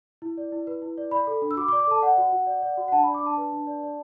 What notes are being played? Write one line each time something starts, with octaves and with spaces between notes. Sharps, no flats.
E4
D5
E4
B4
E4
D5
D5 B5
A4
D4
E6
F#4 D6
D6
D5
D6
A4 A5
D5 F#5
F#4
F#4
D5
D5
F#4
F#5
D4 A5
D5 B5
D6
D4 A5
B4
D4
D5
D5